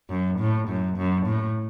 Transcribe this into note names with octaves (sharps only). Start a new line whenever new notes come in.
F#2
A2
F#2
F#2
A2